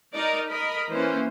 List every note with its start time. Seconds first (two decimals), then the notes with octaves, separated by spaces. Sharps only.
0.14 D#4 A#4 D5 D#5
0.49 A#4 D#5 B5
0.91 E3 A#3 C#4 C5